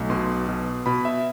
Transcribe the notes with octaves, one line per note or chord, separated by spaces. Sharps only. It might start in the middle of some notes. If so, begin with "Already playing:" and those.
Already playing: B1 A3
B2 C6
B2
B2 B5
E5